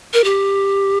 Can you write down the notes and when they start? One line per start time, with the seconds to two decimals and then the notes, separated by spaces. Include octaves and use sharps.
0.13 A#4
0.24 G4